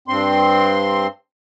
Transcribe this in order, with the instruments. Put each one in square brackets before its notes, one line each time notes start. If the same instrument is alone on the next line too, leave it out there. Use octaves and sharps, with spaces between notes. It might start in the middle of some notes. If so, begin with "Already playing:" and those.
[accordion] G2 C4 C6